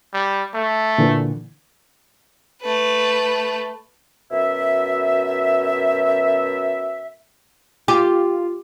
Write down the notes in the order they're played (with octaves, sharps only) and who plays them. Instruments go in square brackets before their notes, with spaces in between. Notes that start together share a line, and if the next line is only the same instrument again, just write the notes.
[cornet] G3
A3
[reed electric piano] A#2 D3 E3
[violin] A3 B4
[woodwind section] F#2 B2 E5
[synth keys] F4 [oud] G4